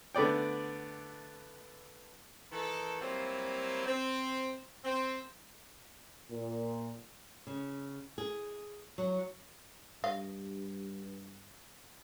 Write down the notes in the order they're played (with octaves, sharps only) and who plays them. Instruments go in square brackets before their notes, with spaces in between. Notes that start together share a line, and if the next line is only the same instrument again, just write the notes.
[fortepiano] D3 A3 B3 D5 G5
[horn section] D#3 E3 A4
F#3 G3 A#3 C4 E4 F4
C4
C4
[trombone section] A#2
[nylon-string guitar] C#3
G#4
F#3
[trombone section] G2 [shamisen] D#5 F5